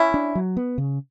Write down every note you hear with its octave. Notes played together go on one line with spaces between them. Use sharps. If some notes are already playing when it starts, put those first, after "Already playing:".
Already playing: C#4 E4
D4
F#3
B3
C#3